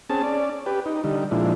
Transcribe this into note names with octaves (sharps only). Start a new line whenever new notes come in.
C4 C#4 G#4 A5
C#4 D5
G4 B4
D#4
D3 G3 D#4
A#2 F3 G#3 D4 E4